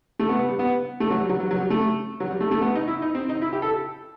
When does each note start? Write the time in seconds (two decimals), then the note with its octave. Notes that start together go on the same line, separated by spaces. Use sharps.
0.19 A3
0.29 B3
0.39 B3
0.49 G3
0.59 B3
1.00 A3
1.10 F#3
1.20 G3
1.29 F#3
1.40 F#3
1.51 F#3
1.60 G3
1.70 A3
2.20 F#3
2.31 G3
2.41 A3
2.51 A3
2.62 B3
2.75 D#4
2.88 E4
3.02 D#4
3.15 C4
3.29 D#4
3.42 E4
3.53 G4
3.62 A4